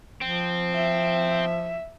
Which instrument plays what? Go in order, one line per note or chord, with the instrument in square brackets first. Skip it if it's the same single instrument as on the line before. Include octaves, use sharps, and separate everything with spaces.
[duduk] F3 [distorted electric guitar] C4
[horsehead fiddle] E5